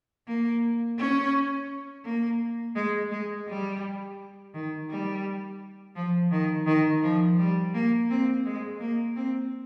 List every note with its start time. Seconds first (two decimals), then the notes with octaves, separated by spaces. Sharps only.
0.27 A#3
0.98 C#4
2.04 A#3
2.76 G#3
3.11 G#3
3.47 G3
4.54 D#3
4.90 G3
5.95 F3
6.31 D#3
6.67 D#3
7.02 F3
7.39 G3
7.74 A#3
8.10 C4
8.45 G#3
8.80 A#3
9.16 C4